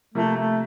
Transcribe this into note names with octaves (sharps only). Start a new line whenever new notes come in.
C3 F3 A3 A#3 E4
A3